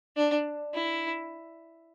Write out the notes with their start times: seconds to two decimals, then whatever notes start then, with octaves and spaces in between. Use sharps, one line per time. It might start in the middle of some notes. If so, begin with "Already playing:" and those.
0.16 D4
0.74 E4